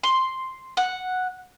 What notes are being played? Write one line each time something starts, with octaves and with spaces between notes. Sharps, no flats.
C6
F#5